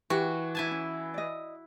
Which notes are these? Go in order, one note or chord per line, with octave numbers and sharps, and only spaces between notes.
E3 F#4 G4
E4 G#5 A5
C#4 E5
D5 D#5